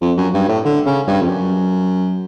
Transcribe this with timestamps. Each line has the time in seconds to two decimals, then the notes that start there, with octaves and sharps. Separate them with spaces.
0.01 F2
0.17 F#2
0.34 G2
0.49 A2
0.65 D3
0.86 C#3
1.07 G2
1.22 F2
1.28 F#2